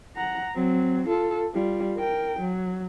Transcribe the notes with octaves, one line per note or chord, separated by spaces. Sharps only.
F#5 A#5
F#3 C4
F4 A4
G3 F4
A#4 G5
F#3